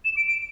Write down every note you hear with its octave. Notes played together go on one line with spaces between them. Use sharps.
E7
D7
D7